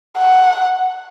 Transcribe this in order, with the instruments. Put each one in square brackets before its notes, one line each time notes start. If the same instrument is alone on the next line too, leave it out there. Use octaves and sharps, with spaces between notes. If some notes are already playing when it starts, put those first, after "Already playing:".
[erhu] F#5